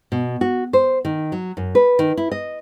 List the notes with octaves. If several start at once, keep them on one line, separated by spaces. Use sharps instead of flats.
B2
F#4
C5
D#3
F#3
F#2
B4
D#3
E4
D#5